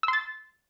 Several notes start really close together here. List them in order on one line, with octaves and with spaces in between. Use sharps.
E6 C6 A6